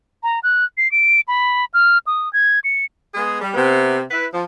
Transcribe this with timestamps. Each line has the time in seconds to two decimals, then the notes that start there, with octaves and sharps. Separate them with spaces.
0.23 A#5
0.43 F#6
0.77 C7
0.91 D7
1.28 B5
1.74 F6
2.07 D#6
2.33 G#6
2.64 C#7
3.15 G#3 B3 G#4
3.41 G3
3.54 C3 B3
4.11 E4 B4
4.33 F3